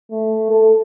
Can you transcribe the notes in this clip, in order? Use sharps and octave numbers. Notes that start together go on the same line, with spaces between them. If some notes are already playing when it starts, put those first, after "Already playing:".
A3
A4